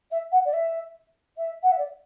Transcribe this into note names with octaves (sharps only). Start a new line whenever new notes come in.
E5
F#5
D5
E5
E5
F#5
E5
D5